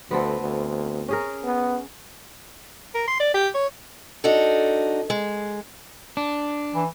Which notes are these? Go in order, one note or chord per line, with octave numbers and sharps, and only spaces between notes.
D2 B3 C4 A4
D2
C#4 G#4 A#4
B3
A#4
C6
D5
G4
C#5
D4 D#4 F#4 A4
G#3
D4
E3